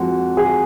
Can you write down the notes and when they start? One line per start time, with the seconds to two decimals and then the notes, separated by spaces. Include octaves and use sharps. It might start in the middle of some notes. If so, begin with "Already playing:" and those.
Already playing: F2 F3 G#3 F#4
0.37 G#4